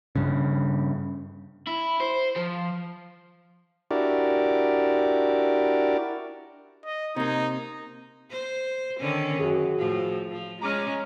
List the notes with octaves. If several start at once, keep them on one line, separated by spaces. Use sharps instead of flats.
G2 C#3
E4
C5
F3
D4 E4 F#4 G4 A#4 D5
D#5
C3 A#3 D#4
C5
D3 D#3 C#4
F#2 F#4 G#4
A2 F3
F3
G#3 C#4 A#5 D6 F6